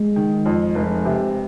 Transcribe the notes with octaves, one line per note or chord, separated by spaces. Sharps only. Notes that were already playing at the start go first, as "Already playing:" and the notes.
Already playing: G#3
D#3
F2
F1
C3